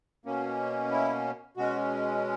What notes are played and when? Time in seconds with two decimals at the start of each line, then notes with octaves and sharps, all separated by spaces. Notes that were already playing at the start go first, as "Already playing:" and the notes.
0.25 B2 A#3 C#4
0.91 E4
1.57 B2 G#3 C#4 F#4